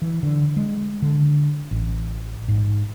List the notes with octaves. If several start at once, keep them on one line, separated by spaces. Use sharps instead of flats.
E3
D3
G#3
D3
A1
G#2